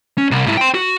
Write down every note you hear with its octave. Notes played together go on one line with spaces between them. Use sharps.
C#4
C2
G#2 E4
G5 C6
F#4